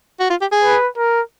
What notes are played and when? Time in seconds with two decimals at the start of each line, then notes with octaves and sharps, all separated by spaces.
0.20 F#4
0.30 F4
0.41 G4
0.52 G#4
0.64 B4
0.97 A#4